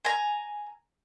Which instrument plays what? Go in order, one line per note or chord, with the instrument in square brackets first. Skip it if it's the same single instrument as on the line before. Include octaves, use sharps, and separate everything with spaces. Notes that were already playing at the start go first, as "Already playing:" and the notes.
[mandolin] G#5 A#5